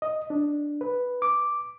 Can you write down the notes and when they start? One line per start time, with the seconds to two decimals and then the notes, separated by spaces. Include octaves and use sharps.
0.02 D#5
0.30 D4
0.81 B4
1.22 D6